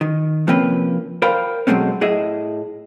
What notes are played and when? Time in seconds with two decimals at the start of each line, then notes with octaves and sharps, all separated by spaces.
0.01 D#3
0.47 C3 F3 A#3 C4 C#4 B4
1.22 A#4 C5 D5 F5 G5 B5
1.67 B2 F#3 G#3 A3 C4 C#4
2.01 A2 E4 G#4 D#5 E5